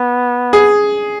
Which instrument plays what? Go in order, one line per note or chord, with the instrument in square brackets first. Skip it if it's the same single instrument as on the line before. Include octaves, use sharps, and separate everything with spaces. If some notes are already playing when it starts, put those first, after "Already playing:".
Already playing: [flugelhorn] B3
[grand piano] G#4